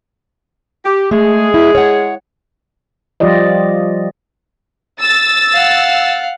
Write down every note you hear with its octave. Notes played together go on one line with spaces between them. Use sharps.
G4
G#3 A3 G#4
E4
C#5 F#5
F3 G3 F4 G4 D5 D#5
E6 A6
F5 F#5